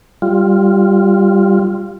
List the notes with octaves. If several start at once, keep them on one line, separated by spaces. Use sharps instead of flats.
G3 F4